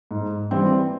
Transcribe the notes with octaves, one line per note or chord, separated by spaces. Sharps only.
G#2
E3 G3 C4